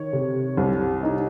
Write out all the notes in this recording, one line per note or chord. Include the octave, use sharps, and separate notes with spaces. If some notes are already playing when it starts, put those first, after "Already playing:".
Already playing: D#3 C#5
C3
C2
D#4